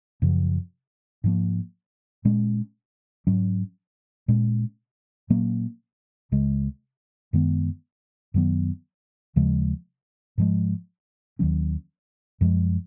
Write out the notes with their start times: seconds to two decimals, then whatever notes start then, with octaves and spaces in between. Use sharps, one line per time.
0.22 F#2 C#3 F3
1.24 G#2 F3 A#3
2.25 A#2 G#3 C#4
3.27 G#2 F#3 C#4
4.28 A#2 G#3 C#4
5.30 A#2 F#3 A#3 C#4
6.32 C#2 C#3 G#3
7.33 F#2 D#3 G#3 B3
8.34 F#2 D#3 F#3 B3
9.36 D#2 C#3 F3 G#3
10.38 G#2 F3 G#3
11.39 D#2 D#3 F#3 C#4
12.41 F#2 F3 G#3